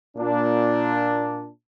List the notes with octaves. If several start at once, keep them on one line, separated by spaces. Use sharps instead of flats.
A#2 D4